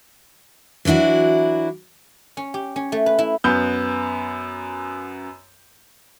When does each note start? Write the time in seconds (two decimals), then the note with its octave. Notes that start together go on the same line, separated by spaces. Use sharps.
0.85 E3 F#3 D4 E4 F#4
2.37 C#4
2.54 G4
2.76 C#4
2.92 A3
3.06 B4
3.19 E4
3.44 F#2 B3 G6